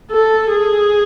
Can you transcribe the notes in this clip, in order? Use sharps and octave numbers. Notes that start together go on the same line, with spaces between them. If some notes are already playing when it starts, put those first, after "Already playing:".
A4
G#4